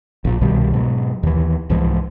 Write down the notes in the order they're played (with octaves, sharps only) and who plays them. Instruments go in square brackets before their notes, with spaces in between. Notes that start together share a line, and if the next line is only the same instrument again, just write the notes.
[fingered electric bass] A#1 A#2
C2 B2 D#3 G3
G#2 B2 F#3
D#2 E3
C2 G#2 E3 F3